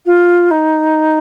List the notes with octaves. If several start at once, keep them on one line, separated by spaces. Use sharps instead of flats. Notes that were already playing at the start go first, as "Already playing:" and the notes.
F4
D#4